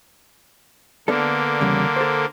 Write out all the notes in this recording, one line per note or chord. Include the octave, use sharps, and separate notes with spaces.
D3 A#3 B3 D4 A4
E2 C#3 G3
A4 C5